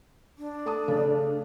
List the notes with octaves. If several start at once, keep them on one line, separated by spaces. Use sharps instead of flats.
D4
A3 A5 D#6
C#3 A3